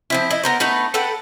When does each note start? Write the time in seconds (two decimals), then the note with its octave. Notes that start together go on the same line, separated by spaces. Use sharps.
0.10 F3 C4 E4
0.31 E4 D#5
0.44 B3 A#4 C5
0.60 A3 B3 D#4 B4
0.94 A4 B4 F#5 G5